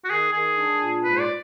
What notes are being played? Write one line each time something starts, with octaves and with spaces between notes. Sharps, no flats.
F#4
D#3 G#4
D#3 G#4
D4
A#2
G#2 B4
D5